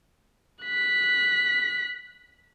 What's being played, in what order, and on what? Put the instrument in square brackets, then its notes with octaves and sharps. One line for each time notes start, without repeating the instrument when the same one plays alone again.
[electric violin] F#6 B6